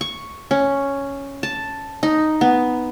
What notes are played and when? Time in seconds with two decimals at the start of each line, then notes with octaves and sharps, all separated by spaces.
0.01 C#6
0.51 C#4
1.43 A5
2.03 D#4
2.41 B3